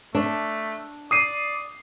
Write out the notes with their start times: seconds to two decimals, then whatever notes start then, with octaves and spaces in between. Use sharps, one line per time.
0.15 A3 D4
1.11 D5 D#6 C7 D#7